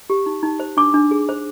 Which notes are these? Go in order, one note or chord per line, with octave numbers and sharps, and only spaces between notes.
G4
D#4
D#4
C5
D4 D6
D4
G#4
C5